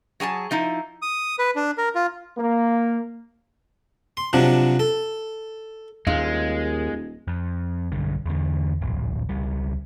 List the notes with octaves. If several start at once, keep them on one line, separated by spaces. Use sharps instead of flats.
F#3 G#4 G#5 A5
F3 D#4 E4
D#6
B4
D4
A#4
F4
A#3
C6
C3 F3 F#3 D4
A4
D#1 D#2 A#2 G#3 D#4 F5
F2
B1 G2 D3
E2 D3
D1 A#1
C#2 G3